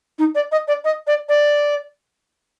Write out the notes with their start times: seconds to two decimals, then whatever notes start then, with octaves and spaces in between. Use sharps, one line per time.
0.18 D#4
0.35 D5
0.52 D#5
0.68 D5
0.84 D#5
1.07 D5
1.29 D5